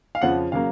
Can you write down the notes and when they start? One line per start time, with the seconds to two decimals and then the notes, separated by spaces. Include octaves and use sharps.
0.15 F5
0.21 F2 C#3 F3 F#5
0.52 C#3 F#3 A#3 F5